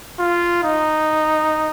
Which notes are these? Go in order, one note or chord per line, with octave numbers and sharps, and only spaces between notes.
F4
D#4